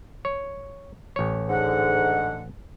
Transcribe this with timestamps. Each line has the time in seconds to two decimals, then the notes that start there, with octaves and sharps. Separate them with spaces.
0.25 C#5
1.16 A1 C#5
1.49 G#2 D3 F#5